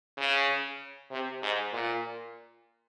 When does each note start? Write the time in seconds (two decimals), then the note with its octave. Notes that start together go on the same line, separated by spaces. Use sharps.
0.18 C#3
1.11 C3
1.42 G#2
1.73 A#2